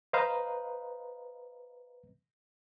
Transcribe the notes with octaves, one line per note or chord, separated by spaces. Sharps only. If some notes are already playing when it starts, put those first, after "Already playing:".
B4 C5 D#5 F5 A#5